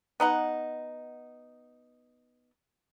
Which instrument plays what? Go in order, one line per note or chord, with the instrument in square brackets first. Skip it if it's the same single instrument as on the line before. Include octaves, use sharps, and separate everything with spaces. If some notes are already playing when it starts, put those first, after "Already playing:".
[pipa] B3 D#4 F#5